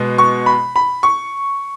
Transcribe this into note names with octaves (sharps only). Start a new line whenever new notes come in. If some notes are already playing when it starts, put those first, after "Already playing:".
Already playing: B2 G#3 B3
C#6
B5
B5
C#6